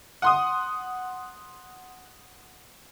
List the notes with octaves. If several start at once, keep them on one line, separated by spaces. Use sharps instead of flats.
F#5 C6 D#6